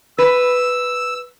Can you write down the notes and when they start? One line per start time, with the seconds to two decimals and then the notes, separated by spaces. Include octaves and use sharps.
0.18 B4 E6